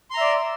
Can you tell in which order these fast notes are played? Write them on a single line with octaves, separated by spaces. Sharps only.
C6 A#5 E5 D5